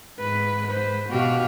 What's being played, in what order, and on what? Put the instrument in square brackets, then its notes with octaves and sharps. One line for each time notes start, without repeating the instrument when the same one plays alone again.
[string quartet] G#2 [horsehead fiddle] B4
[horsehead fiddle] B4 C5
[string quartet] B2 G4 [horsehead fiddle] F#4 F5